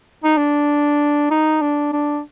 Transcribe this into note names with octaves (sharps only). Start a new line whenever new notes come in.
D#4
D4
D#4
D4
D4